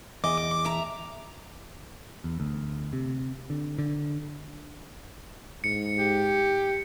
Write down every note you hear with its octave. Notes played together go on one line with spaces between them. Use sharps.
E2 D#5 D6
E5 A#5
E2
D2
C3
D3
D3
G#2 C#7
G4